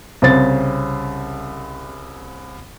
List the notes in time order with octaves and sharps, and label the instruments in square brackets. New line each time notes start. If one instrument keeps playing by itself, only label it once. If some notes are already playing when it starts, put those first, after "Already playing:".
[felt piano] C2 C#3 C5 A6